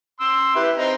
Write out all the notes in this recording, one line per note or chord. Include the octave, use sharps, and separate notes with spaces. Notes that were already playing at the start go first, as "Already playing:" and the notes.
C6 E6
E4 G4 B4
C4 D#4 A#5